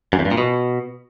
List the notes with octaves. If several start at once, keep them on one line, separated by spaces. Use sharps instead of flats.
F#2
E2
G2
A#2
B2